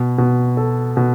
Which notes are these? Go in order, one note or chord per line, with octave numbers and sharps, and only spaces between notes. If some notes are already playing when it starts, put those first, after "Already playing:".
Already playing: B2
B2
A4
B2